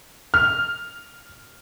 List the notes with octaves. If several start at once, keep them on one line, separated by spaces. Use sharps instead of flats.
F6